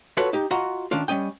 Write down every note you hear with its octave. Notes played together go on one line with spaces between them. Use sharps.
F4 F#4 A4 B4 C#5
D#4 G4
F4 F#4 D#5 F#5 A#5
D#3 C#4 D4 F4
G3 C#4 D#5 G5